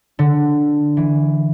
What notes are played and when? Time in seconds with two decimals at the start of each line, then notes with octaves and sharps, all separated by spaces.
0.19 D3
0.97 E3